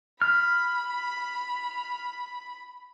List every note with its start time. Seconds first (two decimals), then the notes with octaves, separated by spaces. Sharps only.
0.22 B5 F6